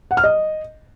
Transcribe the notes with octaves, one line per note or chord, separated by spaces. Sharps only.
F#5
F6
D#5